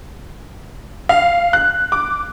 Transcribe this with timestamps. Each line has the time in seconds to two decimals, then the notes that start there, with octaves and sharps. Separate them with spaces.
1.09 F5
1.53 F#6
1.92 D6